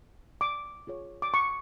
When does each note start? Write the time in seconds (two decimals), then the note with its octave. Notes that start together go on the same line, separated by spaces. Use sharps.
0.41 D6
0.87 F4 G#4 C#5
1.22 D6
1.34 C#6